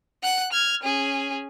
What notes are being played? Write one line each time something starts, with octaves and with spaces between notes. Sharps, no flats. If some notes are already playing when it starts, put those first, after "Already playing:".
F#5 F#6
F6 G#6
C#4 G#4